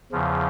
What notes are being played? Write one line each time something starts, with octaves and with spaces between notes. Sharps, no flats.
E2 C#3 F3